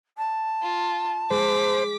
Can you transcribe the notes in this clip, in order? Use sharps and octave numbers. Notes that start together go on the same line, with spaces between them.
A5
F4
G#3 C5 D6 B6